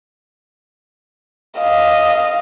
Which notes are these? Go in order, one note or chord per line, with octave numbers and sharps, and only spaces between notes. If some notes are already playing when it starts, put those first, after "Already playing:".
D#5 F5